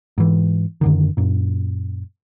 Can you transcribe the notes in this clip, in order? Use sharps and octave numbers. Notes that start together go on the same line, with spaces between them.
G#2 E3
F#2 D3 D#3
F#2 A#2